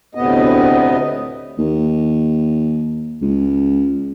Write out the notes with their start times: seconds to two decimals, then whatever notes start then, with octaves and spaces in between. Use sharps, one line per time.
0.15 D2 A2 C3 B3 D#5
1.59 D#2
3.22 C#2